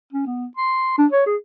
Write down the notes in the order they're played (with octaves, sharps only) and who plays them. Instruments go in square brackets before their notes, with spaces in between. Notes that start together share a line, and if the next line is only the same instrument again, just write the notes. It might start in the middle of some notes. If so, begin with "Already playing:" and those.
[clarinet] C#4
B3
C6
D4
C#5
G#4